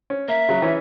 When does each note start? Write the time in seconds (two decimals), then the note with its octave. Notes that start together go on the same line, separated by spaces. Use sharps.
0.10 C#4
0.28 A#3 E5
0.49 C#3 F#3
0.62 E3 C#4